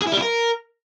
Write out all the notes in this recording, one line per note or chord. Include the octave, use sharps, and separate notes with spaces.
G#4
E4
G3
E4
A#4